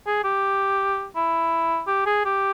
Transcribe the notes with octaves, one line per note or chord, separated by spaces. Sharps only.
G#4
G4
E4
G4
G#4
G4